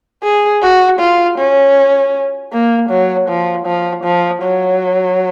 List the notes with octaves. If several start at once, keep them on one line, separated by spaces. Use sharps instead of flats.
G#4
F#4
F4
C#4
A#3
F#3
F3
F3
F3
F#3